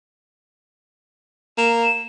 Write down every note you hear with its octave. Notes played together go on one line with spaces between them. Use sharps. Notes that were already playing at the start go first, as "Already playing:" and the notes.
A#3 E7